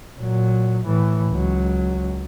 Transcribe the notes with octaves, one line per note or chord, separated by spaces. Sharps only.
A#2 F#3
A2 E3
C#2 F#3